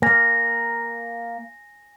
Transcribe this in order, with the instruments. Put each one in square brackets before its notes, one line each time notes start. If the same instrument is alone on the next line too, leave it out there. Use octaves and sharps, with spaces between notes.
[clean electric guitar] A#3 [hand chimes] G#5 A#6